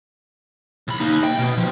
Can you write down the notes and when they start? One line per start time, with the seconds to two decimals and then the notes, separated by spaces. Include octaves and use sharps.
0.88 C2 B5
1.00 A#3 D#4
1.24 G5
1.38 B2
1.57 F3